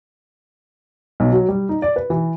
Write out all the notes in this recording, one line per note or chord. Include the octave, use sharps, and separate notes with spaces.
B1
F#3
G3
D#4
D5
B4
E3